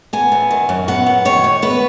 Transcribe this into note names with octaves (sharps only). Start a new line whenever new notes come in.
B3 G#5
F#2
D#3
F#2
B3 F#5
F#2
D#3 C#5
F#2
B3 B4